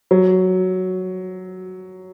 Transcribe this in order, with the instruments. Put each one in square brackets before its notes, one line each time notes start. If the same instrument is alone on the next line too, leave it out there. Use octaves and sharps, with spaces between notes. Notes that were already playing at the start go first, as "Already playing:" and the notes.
[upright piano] F#3